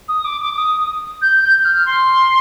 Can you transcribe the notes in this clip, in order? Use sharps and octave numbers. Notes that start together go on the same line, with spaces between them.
D#6
D6
D6
D6
D#6
G6
G6
F6
C6